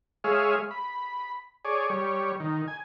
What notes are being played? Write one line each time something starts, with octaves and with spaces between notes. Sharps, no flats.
G#3 G#4 C#5 E5 F5
B5
G#4 C#5 D5
G3 C#5
D#3
G#5